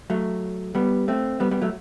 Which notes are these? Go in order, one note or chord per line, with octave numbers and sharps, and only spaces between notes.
F#3 A3
G3 B3
A3 C4
G3 B3
G3 B3
F#3 A3